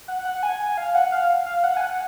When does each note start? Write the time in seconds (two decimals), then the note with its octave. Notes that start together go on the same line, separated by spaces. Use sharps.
0.08 F#5
0.25 F#5
0.43 G#5
0.60 G#5
0.77 F5
0.95 F#5
1.12 F5
1.46 F5
1.64 F#5
1.77 G#5
1.81 F#5